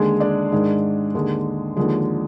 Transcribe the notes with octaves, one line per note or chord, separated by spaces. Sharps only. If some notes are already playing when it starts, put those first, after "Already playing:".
Already playing: D#2 D3 G#3 G#4
D4 D5
G#2 D#3 G#3
D#2 D3 G#3
D#2 D3 F3 G#3